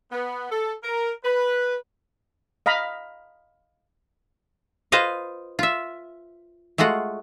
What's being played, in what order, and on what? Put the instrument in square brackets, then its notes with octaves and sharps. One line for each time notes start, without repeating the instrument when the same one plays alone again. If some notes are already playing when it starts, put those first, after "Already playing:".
[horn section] B3
A4
A#4
B4
[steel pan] D#5 F5 A#5 B5
[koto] F4 B4 C5 D#5 F5
F4 E5
G#3 A3 F4 F#4 F#5